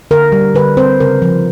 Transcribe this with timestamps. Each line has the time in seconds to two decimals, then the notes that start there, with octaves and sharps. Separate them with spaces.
0.11 D3 A#4
0.32 G3
0.55 D3 B4
0.77 C4 C5
1.00 C#3 A#4
1.22 F3